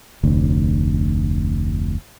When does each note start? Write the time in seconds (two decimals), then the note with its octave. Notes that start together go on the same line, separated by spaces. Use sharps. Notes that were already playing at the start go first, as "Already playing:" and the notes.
0.23 F1 D2